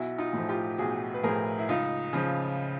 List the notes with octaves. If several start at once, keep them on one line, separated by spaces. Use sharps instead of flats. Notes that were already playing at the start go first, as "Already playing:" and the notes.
Already playing: B1 E4 F#4
D#4 F4
A2 F3
F4 G4
B1 F#4 G#4
B4
A2 F3 G#4 A#4
E4
C#2 D#4 F4
C#3 F3